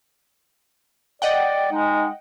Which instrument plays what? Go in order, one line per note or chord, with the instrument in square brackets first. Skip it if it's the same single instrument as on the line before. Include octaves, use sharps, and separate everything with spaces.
[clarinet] D5 [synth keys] D#5 F#5 G5
[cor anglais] G#3 [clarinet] D#4